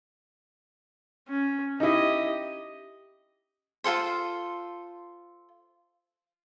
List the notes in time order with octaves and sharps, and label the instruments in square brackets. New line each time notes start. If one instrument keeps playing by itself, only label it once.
[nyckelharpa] C#4
[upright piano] D#4 E4 [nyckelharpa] G4 D#5
[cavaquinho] F4 F#4 A4 C5